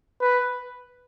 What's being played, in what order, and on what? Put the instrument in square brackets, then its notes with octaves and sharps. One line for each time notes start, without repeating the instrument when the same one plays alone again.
[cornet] B4